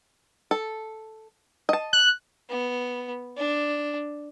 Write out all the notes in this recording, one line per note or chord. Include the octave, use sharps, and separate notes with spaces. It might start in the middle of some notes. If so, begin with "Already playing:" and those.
A4
D#5 A5
F#6
B3
D4